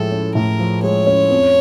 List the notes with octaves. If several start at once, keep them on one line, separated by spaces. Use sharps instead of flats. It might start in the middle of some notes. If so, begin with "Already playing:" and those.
Already playing: A2 F3 G#3 A4
C#4
A2 A#4
F3
G#3 C#5
C#4
F2